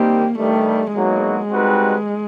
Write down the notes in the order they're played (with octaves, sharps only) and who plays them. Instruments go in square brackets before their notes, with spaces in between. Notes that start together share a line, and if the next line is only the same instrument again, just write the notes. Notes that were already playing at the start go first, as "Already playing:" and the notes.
Already playing: [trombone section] D#3 G3 C4 D#4 G4 [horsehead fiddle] A#3
[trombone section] G2 D#3 G3 [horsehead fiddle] A3
[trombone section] E2 B2 F#3 A#3 D#4 [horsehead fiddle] G#3
[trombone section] G3 C4 D#4 F#4 B4